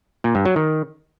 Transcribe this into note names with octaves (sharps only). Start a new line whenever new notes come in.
A#2
G2
F#3
D#3